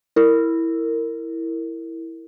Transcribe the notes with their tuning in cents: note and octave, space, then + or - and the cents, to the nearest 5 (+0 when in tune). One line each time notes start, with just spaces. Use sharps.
E4 +0 A#4 -20